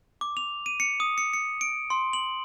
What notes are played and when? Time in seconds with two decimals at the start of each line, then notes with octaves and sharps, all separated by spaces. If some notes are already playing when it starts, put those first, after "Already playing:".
0.21 D6
0.37 F7
0.66 D#7
0.80 C#7
1.00 D#6
1.18 C#7
1.33 C#7
1.61 D7
1.90 C6
2.13 F#7